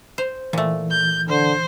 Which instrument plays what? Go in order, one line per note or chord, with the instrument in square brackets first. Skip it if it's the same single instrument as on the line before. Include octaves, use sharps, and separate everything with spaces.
[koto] C5
[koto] A#2 A3 [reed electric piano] E3
[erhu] G6
[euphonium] D3 [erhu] C5